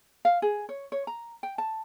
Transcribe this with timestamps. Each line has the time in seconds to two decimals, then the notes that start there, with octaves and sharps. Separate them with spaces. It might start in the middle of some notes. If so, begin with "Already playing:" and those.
0.25 F5
0.42 G#4
0.69 C#5
0.92 C#5
1.07 A#5
1.43 G5
1.58 A5